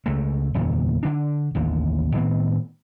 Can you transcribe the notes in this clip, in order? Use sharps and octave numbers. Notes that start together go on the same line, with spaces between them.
C#2 G#3 A3
F#1 E2 A#2 D#3
D3 D4
A1 D#2 D3
A2 D#3 B3 C4